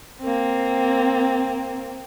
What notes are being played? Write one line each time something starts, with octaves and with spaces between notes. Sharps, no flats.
A#3 C4